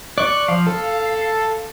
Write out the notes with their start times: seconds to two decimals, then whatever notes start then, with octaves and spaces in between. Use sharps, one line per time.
0.18 D5 C#6 F#6
0.48 F3 F5
0.67 A4